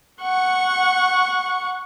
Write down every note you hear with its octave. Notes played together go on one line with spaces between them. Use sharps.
F#5 C#6